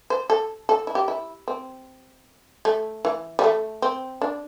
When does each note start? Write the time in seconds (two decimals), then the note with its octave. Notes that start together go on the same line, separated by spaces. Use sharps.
0.10 C5
0.30 A4
0.69 A4
0.87 E4
0.95 G4
1.08 E4
1.48 C4
2.65 A3
3.05 E3
3.39 G3
3.44 A3
3.82 C4
4.21 D4